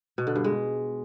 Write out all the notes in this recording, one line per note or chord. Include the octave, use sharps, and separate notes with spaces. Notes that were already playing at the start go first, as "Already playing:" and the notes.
B2
D3
G2
G#3